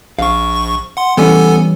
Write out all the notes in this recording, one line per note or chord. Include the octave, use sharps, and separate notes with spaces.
A#1 F5 C#6
F#5 C6
E3 G3 B3 C#4 A4 G#5